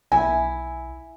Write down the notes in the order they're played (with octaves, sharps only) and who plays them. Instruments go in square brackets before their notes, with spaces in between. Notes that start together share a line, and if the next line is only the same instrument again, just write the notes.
[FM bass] B1 [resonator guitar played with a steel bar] E4 [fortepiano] G#5